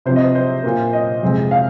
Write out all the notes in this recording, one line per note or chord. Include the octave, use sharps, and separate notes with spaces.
C3 F3 C4 C5
D#5
C5
C5
A#2 A#3
D#5
F2 C3 G#3 C4
F5